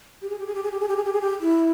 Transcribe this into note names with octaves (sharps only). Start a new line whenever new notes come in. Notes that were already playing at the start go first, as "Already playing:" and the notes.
G4
G#4
G4
G#4
G4
G#4
G4
G#4
G4
G#4
G4
G#4
G4
E4